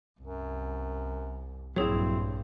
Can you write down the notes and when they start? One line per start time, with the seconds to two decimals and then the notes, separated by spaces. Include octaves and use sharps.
0.21 C2 F#2
1.76 A#1 G2 F#3 C4 E4 G#4 C#5